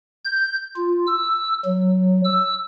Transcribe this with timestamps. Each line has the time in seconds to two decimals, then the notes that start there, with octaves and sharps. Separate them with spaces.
0.25 G6
0.76 F4
1.07 E6
1.65 F#3
2.24 E6